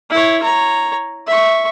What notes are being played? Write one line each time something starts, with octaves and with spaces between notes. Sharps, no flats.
E4 C#5
C#5 A#5
E5 C#6